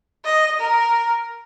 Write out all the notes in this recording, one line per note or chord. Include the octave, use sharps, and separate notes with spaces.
D#5
A#4